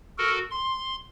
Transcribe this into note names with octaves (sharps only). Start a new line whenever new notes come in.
F#4 A4 A#4
C6